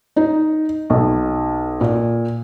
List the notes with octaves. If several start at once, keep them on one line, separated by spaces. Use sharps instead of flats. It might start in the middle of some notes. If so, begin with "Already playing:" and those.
D#4
B1
A#2